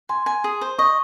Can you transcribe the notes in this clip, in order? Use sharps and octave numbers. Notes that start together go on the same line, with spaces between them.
G#5 C6
G#5
G#4
C5
D#5 C#6